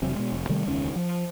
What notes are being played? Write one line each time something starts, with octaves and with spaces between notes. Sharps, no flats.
E1 C3 F#3
B2 G#3
F1
C3 D#3 G3 A3
E1 C#2 D#3 C#4
F3